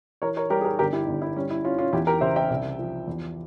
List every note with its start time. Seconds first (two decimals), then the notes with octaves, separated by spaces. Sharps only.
0.22 E3 A#4 C#5
0.37 A#4 C#5
0.50 G3 G4 A#4
0.61 G#4
0.65 G4 A#4
0.79 G1 G4 A#4
0.93 E4 G4
1.08 G1
1.22 E4
1.36 G3 C#4
1.51 E4
1.64 C#4 F4
1.78 C#4 F4
1.93 E2 E4 G4
2.07 G4 A#4
2.21 C#3 C5 E5
2.36 E5 G5
2.50 C2
2.79 F3
3.08 E2